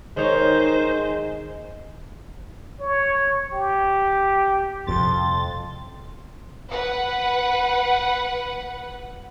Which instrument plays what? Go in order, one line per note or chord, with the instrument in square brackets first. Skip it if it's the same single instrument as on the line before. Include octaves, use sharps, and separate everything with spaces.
[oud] D#3 C#5 [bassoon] G#3 [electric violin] D#4 C5
[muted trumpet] C#5
G4
[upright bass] D#1 C3 [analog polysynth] F2 A6 [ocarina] C6
[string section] B4 F#5